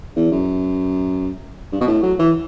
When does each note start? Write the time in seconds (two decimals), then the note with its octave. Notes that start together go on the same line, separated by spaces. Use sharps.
0.16 E2
0.31 F#2
1.72 G2
1.81 B2
1.87 A2
2.02 F#3
2.19 E3